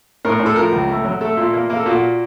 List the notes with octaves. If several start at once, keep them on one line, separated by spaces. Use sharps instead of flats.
A2 A#4
A2
A4
F3 A#4
C#2
A3
F#3
A3 A4
A#2
A#3
A#3
A4
A#2 F#4